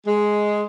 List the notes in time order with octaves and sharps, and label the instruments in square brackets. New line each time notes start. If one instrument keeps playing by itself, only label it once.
[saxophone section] G#3